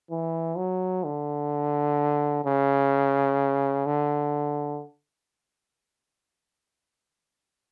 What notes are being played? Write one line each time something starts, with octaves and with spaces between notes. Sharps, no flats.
E3
F#3
D3
C#3
D3